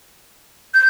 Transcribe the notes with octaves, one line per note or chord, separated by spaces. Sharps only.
G6